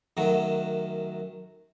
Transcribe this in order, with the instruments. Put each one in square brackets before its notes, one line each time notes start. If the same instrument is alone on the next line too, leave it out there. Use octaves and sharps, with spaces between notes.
[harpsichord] F#2 D#3 F#3 A3